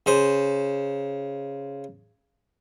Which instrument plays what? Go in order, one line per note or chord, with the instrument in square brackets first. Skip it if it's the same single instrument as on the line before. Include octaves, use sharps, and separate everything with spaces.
[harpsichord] C#3 C5